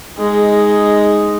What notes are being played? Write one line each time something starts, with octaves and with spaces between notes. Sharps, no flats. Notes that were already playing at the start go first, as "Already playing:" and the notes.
G#3 D#4